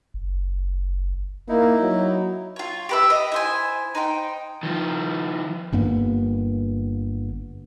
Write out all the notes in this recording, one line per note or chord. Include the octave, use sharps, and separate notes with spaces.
F#1
A#3 D#4 E4
F#3
F4 C#5
G4 B4 E5
D#5
E4 C5 G#5
D#4 C5 G5
D#3 F3
G1 G2 A#3 B3